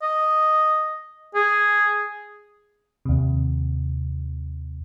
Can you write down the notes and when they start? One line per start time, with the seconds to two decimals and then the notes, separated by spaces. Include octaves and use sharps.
0.02 D#5
1.35 G#4
3.05 D#2 C3